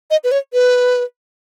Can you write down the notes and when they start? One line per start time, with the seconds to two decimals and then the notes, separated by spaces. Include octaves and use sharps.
0.10 D#5
0.24 B4
0.31 C#5
0.53 B4